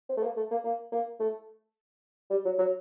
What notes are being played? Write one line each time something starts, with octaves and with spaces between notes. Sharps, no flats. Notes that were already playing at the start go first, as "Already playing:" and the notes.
C4
A3
A#3
A3
A#3
A#3
A#3
A3
G3
F#3
F#3